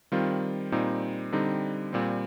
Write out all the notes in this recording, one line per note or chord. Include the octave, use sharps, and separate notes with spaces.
D#3 G3 C4 F4
A#2 G3 C4 D#4
D3 G3 C4 D#4
A#2 G3 C4